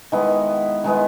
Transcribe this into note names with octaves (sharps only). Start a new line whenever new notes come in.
D#3 G#3 B3 E4
D#3 G#3 B3 E4